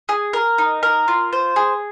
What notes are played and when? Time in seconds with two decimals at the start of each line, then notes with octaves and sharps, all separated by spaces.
0.09 G#4
0.33 A#4
0.58 D#4
0.83 A#4
1.08 F4
1.33 C5
1.56 G#4